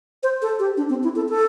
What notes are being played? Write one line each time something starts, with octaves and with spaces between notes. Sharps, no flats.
C5
A4
G4
D4
C4
E4
A4
A4